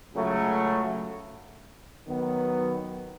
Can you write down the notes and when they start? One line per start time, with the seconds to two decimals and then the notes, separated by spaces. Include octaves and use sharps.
0.13 C#2 C#3 F#3 A3
2.06 D#3 F#3 B3